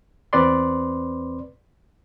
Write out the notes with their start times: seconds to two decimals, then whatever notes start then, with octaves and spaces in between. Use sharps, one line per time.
0.33 E2 C4 B4 D5 C6